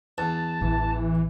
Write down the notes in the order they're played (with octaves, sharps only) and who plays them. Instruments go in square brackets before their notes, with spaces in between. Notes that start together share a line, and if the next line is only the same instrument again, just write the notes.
[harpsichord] E2 [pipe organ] A5
[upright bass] A1 [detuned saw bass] E3